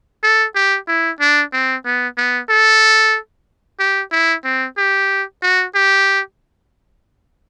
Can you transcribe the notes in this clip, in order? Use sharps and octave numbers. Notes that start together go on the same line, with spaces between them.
A4
G4
E4
D4
C4
B3
B3
A4
G4
E4
C4
G4
F#4
G4